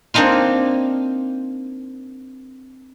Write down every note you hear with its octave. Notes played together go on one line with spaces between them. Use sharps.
A#3 C4 D4 D#4 F4